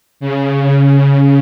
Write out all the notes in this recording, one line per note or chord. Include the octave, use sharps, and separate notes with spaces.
C#3